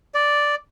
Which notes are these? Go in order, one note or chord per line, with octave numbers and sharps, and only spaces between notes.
D5